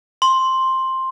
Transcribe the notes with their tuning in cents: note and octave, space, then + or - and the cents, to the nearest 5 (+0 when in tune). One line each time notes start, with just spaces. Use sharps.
C6 +5